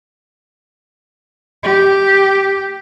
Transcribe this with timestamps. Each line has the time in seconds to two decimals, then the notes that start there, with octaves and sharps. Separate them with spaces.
1.63 G4